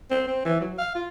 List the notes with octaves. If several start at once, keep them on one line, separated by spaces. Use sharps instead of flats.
C4
C4
E3
F#3
F5
F4